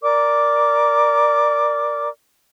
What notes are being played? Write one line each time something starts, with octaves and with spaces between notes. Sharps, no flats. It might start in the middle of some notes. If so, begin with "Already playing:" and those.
A#4 D5 D6